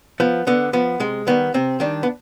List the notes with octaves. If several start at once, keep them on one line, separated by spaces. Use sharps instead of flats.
F3 B3
D3 B3
F3 B3
C3 G#3
D#3 G3 B3
C3 C4
D#3 G3 D4
B3